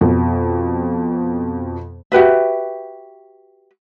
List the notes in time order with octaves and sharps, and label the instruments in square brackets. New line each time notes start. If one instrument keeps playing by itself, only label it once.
[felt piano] F2 B2
[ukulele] F#4 G4 B4 E5